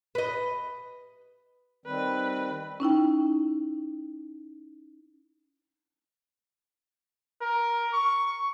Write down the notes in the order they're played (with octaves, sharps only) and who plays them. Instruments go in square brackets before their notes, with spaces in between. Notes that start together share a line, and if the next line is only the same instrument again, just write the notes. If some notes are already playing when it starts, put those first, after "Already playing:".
[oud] B4 D#5
[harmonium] D#3 G3 C4 [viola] B4
[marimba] C#4 D#4 E4 G5
[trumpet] A#4
C#6